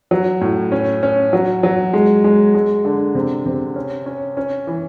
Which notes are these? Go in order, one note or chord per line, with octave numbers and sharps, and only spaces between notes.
F#3
A2
C#4
C#4
F#3
F#3
G#3
G#3
G#3
D3
C3
C3
C#4
C#4
C#4
E3